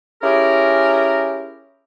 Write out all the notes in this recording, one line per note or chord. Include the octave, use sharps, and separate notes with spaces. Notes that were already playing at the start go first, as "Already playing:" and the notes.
C#4 E4 G4 G#4 A#4